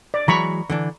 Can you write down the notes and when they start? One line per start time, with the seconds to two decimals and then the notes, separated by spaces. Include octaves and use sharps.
0.14 D5
0.28 E3 F#3 G#3 A#5 B5 C#6
0.70 D3 E3 D4